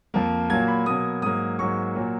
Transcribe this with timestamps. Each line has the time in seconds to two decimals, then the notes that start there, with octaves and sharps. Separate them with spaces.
0.14 F2 F3 A#3
0.50 A#2 F#3 A#3 G#6
0.68 B5
0.86 B2 F#3 A#3 D#6
1.22 G#2 F#3 A#3 D#6
1.59 G#2 F#3 A#3 C#6
1.95 A#2 F#3 A#3